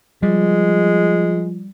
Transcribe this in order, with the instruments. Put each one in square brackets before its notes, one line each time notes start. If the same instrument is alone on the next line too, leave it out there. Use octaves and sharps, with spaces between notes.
[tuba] F3 [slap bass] G3 [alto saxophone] G#3